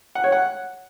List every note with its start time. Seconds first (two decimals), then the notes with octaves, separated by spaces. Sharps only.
0.15 F#5
0.24 C#5
0.32 F#5